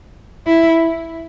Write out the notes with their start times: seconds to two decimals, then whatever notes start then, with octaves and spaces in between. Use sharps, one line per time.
0.46 E4